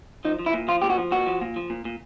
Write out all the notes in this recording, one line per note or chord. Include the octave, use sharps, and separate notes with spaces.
F3 D#4
F3
E4
A#2
F3 F4
A#2 G4
F#4
F3
A#2 F#4
F3
A#2
F3
A#2
A#2